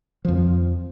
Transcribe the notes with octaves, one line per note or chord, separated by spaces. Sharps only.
F2 F3